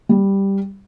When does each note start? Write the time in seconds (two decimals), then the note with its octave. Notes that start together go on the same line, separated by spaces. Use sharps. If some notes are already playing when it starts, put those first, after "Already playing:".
0.09 G3